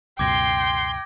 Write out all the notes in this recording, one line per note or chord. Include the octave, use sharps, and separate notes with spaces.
C#2 F#2 B2 G5 C6 D6 G#6 A#6